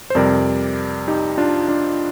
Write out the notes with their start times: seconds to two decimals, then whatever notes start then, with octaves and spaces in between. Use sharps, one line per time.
0.10 C5
0.15 F2 C3 G3 A#4 D5
1.08 D#4 G4
1.37 D4 F4
1.69 D4 F4